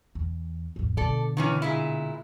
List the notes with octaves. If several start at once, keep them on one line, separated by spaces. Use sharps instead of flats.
E2
A1 F2
B2 D3 A4 D5
D#3 E3 C#4
A#2 G#3 E4